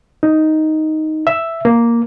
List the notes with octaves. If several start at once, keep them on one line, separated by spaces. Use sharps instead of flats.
D#4
E5
A#3